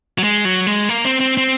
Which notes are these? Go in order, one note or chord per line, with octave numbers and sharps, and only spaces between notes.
F#3
G#3
F#3
G#3
A#3
C4
C4
C4